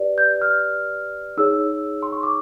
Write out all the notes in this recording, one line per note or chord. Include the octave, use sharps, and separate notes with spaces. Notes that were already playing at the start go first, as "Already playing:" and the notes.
Already playing: G4 B4 D5
G6
F6
D#4 G#4 C#5 E6
C6
C#6
D6